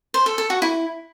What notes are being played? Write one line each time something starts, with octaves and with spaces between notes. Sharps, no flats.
C5
A4
A4
F#4
E4